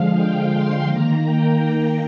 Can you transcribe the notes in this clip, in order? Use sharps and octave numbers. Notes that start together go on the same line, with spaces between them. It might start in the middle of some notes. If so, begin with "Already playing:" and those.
Already playing: D3 F3 G#3 F5
G5
C6
D#3 A#3 A#5
G5